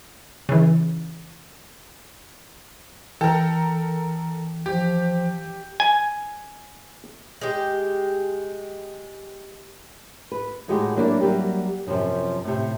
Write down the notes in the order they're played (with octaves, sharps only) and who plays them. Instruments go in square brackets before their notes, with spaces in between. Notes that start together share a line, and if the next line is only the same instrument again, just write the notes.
[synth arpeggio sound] C#3 E3
[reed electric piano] E3 G5 [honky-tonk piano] A4 A#4
[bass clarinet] F3 [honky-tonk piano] G4
[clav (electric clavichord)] G#5
[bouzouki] G#3 G4
[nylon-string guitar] B4
A2 G#3 D#4 F#4 G4
F#3 A#3 D4 E4 A#4 D5
F#3 G3 A#3 G4
F#2 C3 D#3 F3 F#3
A2 C3